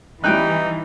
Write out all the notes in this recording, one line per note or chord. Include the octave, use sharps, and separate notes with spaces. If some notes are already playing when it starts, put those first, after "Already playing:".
E3 G3 D#4 G5 F#6